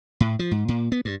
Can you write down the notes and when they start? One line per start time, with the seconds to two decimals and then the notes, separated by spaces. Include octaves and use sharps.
0.20 A2
0.39 F3
0.51 G#2
0.68 A#2
0.92 B3
1.05 G2